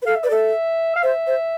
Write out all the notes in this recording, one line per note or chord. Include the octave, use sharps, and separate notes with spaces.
B4
A4 F5
E5
B4 D5
A4 E5
F5
C5 E5
C5